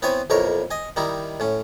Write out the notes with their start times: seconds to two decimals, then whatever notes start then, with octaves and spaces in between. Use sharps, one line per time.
0.02 B3 C4 E4 C5 C#5 G#5
0.30 B1 F2 E4 A#4 C#5 C#6
0.71 D#5 G#5
0.96 D#3 G3 D#4 E4
1.40 A2 C#4